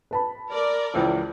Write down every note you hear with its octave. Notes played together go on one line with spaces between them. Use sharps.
B4 A5 B5
A#4 D5
C#2 E3 F3